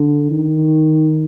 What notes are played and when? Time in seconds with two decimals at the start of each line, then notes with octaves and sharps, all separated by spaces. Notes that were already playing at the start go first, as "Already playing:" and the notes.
Already playing: D3
0.31 D#3